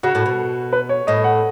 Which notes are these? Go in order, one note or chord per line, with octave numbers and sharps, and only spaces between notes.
C#3 F#4
A2
B2
B4
C#5
A2 D#5
F#5